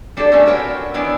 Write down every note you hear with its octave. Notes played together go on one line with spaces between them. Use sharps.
G3 D4 F#4 G4 A4 D5
A3 B3 C#4
F#4 A#4 B4 C#5 F#5 G5
D#3 E3 B3 D4 E4